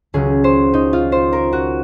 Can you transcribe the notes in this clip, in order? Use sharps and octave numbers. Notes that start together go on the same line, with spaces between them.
C#2 C#3 F#3 G#4
C5
D#4
F4
C5
A#4
F#4